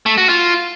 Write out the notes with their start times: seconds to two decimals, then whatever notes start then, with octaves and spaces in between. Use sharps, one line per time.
0.06 A3
0.17 F#4
0.29 F4